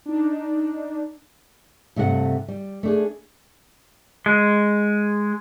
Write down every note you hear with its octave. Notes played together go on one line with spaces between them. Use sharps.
D4 D#4
G2 C3 A3 G4 F#5
G3
A3 D4 G#4
G#3